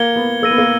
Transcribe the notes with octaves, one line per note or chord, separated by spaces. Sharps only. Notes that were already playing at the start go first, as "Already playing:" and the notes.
Already playing: A#3 G#6 C#7 G7
B3
A#3 E6 A#6 D#7
B3
A#3